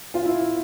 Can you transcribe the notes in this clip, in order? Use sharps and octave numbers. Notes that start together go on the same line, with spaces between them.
F4
E4